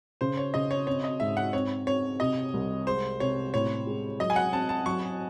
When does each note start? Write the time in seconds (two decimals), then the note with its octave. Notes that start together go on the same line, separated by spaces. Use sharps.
0.21 C#3 C5
0.37 C#5
0.54 C#3 D#5
0.71 C#5
0.87 C4 C#5
1.04 D#5
1.20 G#2 E5
1.37 F#5
1.53 C4 C#5
1.87 C4 C#5
2.20 C3 D#5
2.54 C2
2.87 G#3 C5
3.20 C3 C#5
3.53 A2 C#5
3.87 G#3
4.19 F#3 D#5
4.30 G#5
4.36 F#5
4.53 C4 A5
4.69 A5
4.86 F#3 C#6